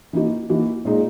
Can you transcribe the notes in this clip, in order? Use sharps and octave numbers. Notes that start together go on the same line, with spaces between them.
E3 A#3 D#4 F#4
E3 A#3 D#4 F#4
A#2 G#3 D#4